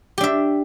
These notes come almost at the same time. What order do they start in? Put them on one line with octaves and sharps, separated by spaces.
G4 D4 E5